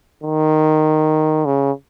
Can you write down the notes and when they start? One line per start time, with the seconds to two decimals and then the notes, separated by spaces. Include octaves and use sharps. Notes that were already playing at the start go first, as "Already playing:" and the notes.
0.23 D#3
1.46 C#3